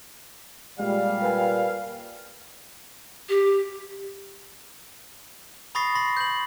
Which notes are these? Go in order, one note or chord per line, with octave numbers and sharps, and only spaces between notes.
A#2 G3 G#3 F5
A#4 B4 G#5
G4
B5 C#6 D#6 A6 A#6 C7
C6 A#6
G6 F#7